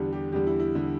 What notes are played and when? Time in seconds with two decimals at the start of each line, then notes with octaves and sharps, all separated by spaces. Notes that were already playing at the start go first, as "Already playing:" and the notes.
Already playing: E2 D3 G3 G4
0.13 G4
0.32 E2 D3 G3 G4
0.47 E4
0.60 E4
0.75 D3 G3